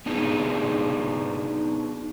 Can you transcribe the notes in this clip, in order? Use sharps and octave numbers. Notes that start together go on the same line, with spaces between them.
B3 D4 D#4 G#4 B4